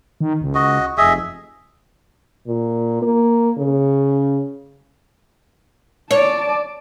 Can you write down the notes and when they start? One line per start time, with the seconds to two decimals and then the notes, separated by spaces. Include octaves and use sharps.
0.21 D#3
0.41 C#2
0.55 F#4 D#5
0.98 F1 G#4 D#5 E5
2.47 A#2
3.02 A#3
3.58 C#3
6.11 C#5 D5 A5